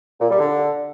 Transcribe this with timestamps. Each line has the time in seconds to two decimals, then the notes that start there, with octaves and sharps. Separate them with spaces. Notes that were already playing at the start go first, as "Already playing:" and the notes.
0.20 A#2
0.29 G3
0.39 D3